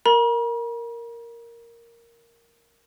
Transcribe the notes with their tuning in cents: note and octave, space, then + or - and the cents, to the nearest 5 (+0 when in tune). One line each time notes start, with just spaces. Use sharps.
A#4 +0 A#5 +45